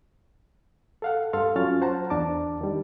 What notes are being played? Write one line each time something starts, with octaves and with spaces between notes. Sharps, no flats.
A4 F5 F#5
G2 A4 F5 C6
F#3 C#4 F4 C#5 F6 A6
C5 F#5 A5 A#5
E2 D4 A5 D6
D#3 G3